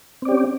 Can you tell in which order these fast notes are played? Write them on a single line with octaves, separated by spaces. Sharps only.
C4 D5 G4 C#4